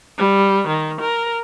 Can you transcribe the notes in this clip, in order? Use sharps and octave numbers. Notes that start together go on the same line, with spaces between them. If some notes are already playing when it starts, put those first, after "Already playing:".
G3
D#3
A#4